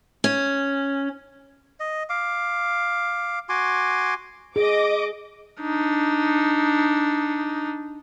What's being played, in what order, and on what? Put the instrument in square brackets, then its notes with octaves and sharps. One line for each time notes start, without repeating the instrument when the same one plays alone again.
[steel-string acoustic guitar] C#4
[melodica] D#5
F5 D6
F#4 G#5 C6 D6
[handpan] G#4 [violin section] D#5 D6
[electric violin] D4 D#4